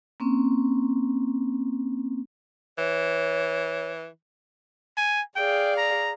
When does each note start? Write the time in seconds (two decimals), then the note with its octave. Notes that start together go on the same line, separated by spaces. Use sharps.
0.20 A#3 C4 C#4
2.78 E3 C#5
4.97 G#5
5.36 G#4 D5 F5 G5
5.78 A#5